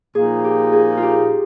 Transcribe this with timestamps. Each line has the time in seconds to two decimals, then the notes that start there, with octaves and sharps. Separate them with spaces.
0.15 A#2 F3 A#3 D#4 G#4
0.44 G4
0.73 G#4
0.97 F4
1.02 G4